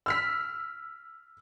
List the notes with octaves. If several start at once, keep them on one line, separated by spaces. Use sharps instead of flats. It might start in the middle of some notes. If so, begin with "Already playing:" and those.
E6 F6 B6